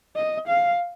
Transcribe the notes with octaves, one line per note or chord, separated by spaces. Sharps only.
D#5
F5